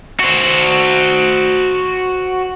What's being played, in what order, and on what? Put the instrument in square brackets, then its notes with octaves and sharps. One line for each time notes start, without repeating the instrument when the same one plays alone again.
[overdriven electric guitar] F#4 C5